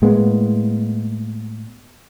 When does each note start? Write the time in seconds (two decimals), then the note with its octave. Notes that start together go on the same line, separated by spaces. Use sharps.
0.02 A2 G#3 A#3 B3